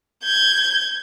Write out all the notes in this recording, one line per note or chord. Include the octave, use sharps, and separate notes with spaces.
G6 G#6